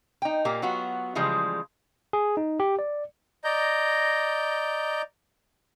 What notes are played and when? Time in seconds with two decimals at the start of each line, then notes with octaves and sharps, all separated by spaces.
0.22 D#4 G5
0.45 A#2 A#3 G4
0.62 F#3 B3 F4 F#4
1.15 C#3 E3 F3 G3 G#3
2.13 G#4
2.37 D#4
2.60 G4
2.79 D5
3.44 D5 D#5 A#5 G6